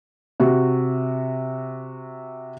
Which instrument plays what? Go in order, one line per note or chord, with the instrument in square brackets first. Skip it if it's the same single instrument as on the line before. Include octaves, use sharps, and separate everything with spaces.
[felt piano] C3 F#4